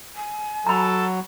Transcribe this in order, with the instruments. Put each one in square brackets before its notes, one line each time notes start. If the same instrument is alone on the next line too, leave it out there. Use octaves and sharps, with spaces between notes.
[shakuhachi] G#5
[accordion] F#3 [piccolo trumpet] A4 [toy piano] A#5 B5